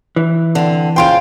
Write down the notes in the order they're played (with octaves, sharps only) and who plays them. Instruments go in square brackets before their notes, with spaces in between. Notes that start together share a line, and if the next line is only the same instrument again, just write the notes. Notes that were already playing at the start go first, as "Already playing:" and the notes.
[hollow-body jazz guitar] E3
[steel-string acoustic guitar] D3 C4
[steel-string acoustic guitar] C#3 F4 C5 [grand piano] G5 C6 D7